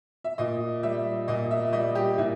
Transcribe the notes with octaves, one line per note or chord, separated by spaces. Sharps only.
E5
A#2 D#5
G3 E5
A#2 D#5
E5
G3 D#5
G4
A#2 E4